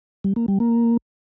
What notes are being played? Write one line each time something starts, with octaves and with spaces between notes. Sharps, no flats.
G3
A#3
G3
A#3